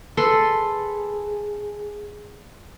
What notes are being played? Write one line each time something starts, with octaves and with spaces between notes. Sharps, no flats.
G#4 A4 B4 C6